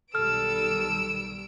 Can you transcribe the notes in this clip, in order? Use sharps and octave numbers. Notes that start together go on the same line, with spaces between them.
B1 D#3 G3 A4 E6 F6 D7